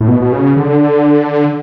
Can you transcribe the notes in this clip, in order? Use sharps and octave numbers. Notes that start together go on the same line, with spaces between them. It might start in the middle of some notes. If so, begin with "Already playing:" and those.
A2
B2
B2
C#3
D3